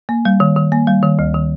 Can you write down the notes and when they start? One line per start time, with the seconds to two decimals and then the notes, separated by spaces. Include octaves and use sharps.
0.09 A#3
0.25 G3
0.40 D#3
0.56 D#3
0.72 A#3
0.87 G3
1.03 D#3
1.19 D2
1.34 D#3